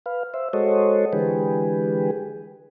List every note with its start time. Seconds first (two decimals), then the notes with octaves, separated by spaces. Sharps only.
0.06 B4 F5
0.34 C5 E5
0.53 G#3 F#4 A4 C5 C#5 D#5
1.13 D3 E3 G#3 G4 G#4 B4